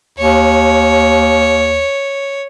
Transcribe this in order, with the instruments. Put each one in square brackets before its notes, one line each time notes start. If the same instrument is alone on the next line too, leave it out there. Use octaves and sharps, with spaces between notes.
[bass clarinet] D#2 [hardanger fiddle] C#5